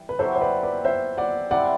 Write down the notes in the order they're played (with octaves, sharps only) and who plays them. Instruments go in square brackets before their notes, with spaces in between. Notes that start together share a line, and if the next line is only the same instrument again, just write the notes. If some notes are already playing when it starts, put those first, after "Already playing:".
Already playing: [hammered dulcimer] E3 G3
[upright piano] B4
[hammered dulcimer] F#3 C4 E4 G4 [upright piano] A4 C5
[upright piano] C5
B4 D5
B4 D5
C5 E5
D5 F#5
[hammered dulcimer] C3 G3 C4 E4 [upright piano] D5 F#5